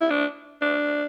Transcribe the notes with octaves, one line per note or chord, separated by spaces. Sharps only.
E4
D4
D4